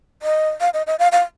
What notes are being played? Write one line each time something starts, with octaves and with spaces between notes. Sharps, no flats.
D#5
F5
D#5
D#5
F5
F5